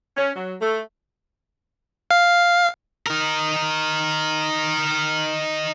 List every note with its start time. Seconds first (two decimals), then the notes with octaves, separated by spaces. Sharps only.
0.17 C#4
0.36 F#3
0.61 A3
2.11 F5
3.07 D#4 A#4